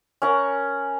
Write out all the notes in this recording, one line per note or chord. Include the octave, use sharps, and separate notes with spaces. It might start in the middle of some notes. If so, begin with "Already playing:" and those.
C#4 A#4 F#5